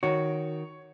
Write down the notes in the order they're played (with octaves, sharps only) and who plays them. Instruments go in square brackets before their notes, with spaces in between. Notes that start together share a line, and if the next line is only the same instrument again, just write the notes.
[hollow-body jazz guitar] D#3 F#4 [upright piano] C#5